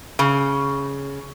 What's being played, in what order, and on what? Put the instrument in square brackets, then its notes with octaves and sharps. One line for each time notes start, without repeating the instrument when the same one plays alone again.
[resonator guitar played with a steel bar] C#3